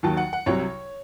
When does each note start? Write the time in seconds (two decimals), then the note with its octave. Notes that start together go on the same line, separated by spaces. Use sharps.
0.03 D#2 D#3 F#3 A5
0.17 F#5
0.33 F#5
0.46 C2 C3 F#3 C#5